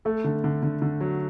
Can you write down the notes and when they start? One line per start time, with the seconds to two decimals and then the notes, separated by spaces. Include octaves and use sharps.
0.05 A3 A4
0.24 D3
0.44 D3
0.63 D3
0.82 D3
1.01 F#3